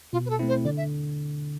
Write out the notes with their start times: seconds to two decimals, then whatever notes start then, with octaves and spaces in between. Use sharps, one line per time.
0.13 B2 F4
0.26 B4
0.30 A4
0.39 A3 C4 E4
0.48 C5
0.65 D3 D5
0.77 E5